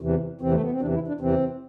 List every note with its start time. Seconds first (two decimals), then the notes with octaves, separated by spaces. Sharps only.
0.01 E2 C3 E3
0.41 E2 C3 E3 C4
0.52 A3
0.61 B3
0.71 C4
0.81 E2 C3 E3 D4
0.94 E4
1.08 D4
1.21 E2 C3 E3 C4